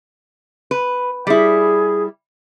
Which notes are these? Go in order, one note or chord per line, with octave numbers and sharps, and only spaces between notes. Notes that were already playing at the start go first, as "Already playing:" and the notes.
B4
G3 E4 G#4